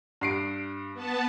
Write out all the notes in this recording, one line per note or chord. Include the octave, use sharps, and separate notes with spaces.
G2 C7 D7
B3 A5